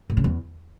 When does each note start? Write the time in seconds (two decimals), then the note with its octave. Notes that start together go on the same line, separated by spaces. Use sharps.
0.10 A2
0.17 C#3
0.24 E2